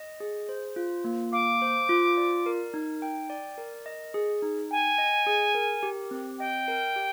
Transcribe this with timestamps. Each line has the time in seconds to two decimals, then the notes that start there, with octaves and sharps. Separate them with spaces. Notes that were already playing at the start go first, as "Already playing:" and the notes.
Already playing: D#5
0.20 G#4
0.49 C5
0.76 F4
1.04 A#3
1.33 F5 D6
1.62 C5
1.89 F4
2.17 D5
2.46 A#4
2.74 D#4
3.02 G5
3.30 D5
3.58 A#4
3.86 D#5
4.14 G#4
4.42 D#4
4.71 G5 G#5
4.98 D#5
5.27 G#4
5.55 A#4
5.83 G4
6.11 C4
6.39 D#5 G5
6.68 A#4
6.96 G4